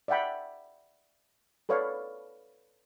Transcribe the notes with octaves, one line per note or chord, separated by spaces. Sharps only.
D5 E5 F#5 G5 B5
A4 B4 C#5 D5 F5